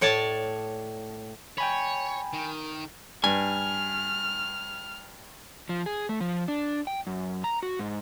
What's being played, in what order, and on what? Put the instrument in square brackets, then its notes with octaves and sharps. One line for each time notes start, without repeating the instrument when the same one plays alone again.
[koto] A2 C#5 D5 A5
[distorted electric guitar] C#5 [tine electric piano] G5 G#5 B5
[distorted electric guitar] D#3
[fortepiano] G2 [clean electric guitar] G#5 [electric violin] F6
[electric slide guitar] F3
G#4
A3
F3
D4
G5
F#2
A#5
F#4
G#2